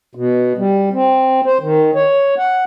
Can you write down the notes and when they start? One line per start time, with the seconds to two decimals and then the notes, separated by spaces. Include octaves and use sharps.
0.15 B2
0.58 G3
0.93 C4
1.46 C5
1.61 D#3
1.95 C#5
2.38 F#5